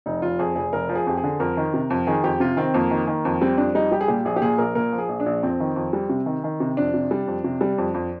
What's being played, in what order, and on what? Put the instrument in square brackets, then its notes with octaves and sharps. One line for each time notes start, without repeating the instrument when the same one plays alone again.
[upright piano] F1 D#4
F1 F4
F2 G#4
F1 G#4
F1 A#4
F3
G#4
F2 G4
G#4
D3
F2 A#4
D#3
C3
F2
D#3 G#4
F2 G4
C3 F4
D#3 C4
F2 A#3
D#3
D#3
F2
G3 C4
F2 D4
G3 D#4
G3 G4
G#4
A#2 G4
A#1 G#4
G4
A#2 G#4
A#1 A#4
A#2 A#4
F3
G#4
A#1
D4
A#1
F2 C4
D#3
F2
G3
C3
D#3
D#3
C3
F2 D4
C3
G3
F2
C3
G3
F2
F2